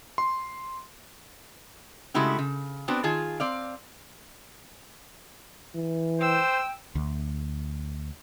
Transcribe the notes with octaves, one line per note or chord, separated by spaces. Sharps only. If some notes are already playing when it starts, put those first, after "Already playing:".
C6
C#3 G#3 A3 E4 F#4 G4
C#3
B3 C4 D4 F#4
D#3 F4 G#4 A5
C4 D5 F5
E3
C5 G5 E6
D2